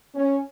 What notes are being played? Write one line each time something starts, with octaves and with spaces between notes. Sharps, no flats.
C#4